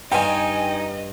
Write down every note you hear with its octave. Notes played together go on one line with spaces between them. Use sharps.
G2 D#4 G4 D#5 G5 G#5